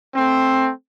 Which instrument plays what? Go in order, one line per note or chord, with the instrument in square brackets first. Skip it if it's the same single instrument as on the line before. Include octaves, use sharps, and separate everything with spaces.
[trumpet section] A3 C4